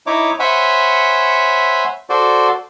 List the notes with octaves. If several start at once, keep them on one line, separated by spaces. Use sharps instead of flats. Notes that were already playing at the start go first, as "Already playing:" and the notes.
D#4 E4 C#5 D6
C5 C#5 E5 F#5 G#5 B5
F#4 A4 C5 D5